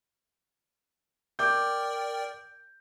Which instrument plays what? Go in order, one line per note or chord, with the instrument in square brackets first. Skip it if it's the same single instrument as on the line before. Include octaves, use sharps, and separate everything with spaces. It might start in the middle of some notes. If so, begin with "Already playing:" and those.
[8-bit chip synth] A#4 D5 G5 [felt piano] D6 G6